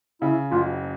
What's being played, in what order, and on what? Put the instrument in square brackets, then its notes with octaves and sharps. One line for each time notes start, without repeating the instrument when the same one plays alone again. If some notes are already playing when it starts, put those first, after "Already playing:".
[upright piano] C#3 [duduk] E4
[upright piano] F#1 [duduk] F4